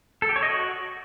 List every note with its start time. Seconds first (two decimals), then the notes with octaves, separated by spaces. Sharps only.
0.22 A4
0.29 G4
0.36 C#5
0.43 D#5
0.49 F#4